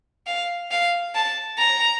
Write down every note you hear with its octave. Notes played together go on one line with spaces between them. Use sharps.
F5
F5
A5
A#5